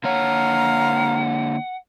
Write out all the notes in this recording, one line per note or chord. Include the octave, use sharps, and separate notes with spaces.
D3 A#3 C#5 F5 F#5 A#5